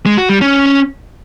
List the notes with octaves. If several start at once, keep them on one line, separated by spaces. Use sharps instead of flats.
G#3
F#4
G3
C#4